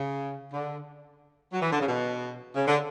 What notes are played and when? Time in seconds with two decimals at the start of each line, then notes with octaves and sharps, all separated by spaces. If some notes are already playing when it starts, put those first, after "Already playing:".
Already playing: C#3
0.53 D3
1.53 F#3
1.62 E3
1.71 D3
1.79 C#3
1.88 B2
2.56 C#3
2.67 D3